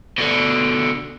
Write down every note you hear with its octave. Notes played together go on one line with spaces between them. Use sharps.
B2 D3